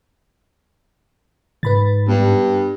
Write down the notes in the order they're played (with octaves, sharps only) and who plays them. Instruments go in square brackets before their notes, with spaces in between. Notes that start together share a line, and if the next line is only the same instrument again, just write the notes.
[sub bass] G#2 [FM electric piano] B4 B5 A6
[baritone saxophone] G2 [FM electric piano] B3 D4